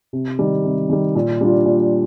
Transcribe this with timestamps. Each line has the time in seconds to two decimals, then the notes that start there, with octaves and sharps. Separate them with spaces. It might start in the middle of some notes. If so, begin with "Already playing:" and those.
0.13 C3
0.39 D#3 G3
0.64 C3
0.89 D#3 G3
1.15 A#2
1.41 G3 D4 F4
1.66 A#2